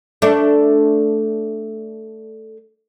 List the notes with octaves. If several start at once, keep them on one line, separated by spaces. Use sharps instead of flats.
A3 D4